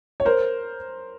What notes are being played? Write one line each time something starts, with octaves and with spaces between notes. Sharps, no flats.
C#5
A#4 C5